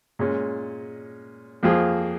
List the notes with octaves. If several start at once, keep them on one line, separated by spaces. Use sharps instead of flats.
A#2 G#3 C#4
F2 F3 A#3 F4 G#4